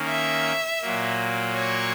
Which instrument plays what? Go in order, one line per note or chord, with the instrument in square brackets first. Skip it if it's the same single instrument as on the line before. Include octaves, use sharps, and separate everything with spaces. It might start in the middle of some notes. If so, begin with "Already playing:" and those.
Already playing: [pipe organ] D#3 A#3 C#4
[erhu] E5
[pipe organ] A#2 F#3 A#3
[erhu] C#5